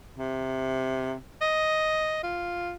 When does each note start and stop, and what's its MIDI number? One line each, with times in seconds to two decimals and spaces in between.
0.17 1.14 48
1.41 2.19 75
2.23 2.74 65